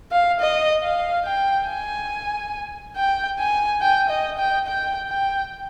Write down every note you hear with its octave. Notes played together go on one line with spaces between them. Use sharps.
F5
D#5
F5
G5
G#5
G5
G#5
G5
D#5
G5
G5
G5